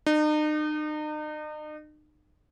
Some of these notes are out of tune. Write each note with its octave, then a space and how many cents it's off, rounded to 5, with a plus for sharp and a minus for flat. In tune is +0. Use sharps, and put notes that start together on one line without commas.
D#4 -40